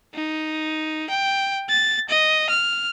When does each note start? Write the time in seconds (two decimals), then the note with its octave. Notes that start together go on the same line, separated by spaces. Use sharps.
0.15 D#4
1.10 G5
1.70 A6
2.10 D#5
2.50 F6